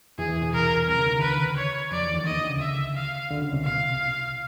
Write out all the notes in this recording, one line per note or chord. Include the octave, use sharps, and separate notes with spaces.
E2 E3 G#4
E2 E3
B2
C2 C3 A#4
C2 C3 A#4
C#2 C#3
D#3
D3 B4
D#2 D#3
C#5
F2 F3 D5
E2 E3
D#2 D#3
D#2 D#3 D#5
D2 D3
C#2 C#3
E5
F5
D2 D3
C#2 C#3
C2 C3
B2 F5
C2 C3